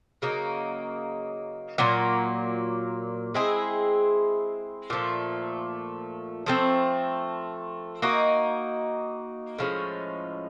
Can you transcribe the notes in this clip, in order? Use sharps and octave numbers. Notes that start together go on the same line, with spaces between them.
C#3 F#3 A#3 D#4
A#2 F#3 A#3
G#3 C4 E4 G#4
A#2 F3 A3
F3 A3 C4
A#3 D#4 F#4
A2 F3 G#3 C#4